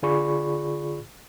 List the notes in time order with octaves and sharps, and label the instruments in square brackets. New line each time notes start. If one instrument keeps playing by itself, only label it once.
[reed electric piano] D3 F4 G#4 D5 B5 C#6